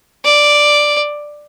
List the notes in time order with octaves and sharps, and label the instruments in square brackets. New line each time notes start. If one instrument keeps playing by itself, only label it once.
[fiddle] D5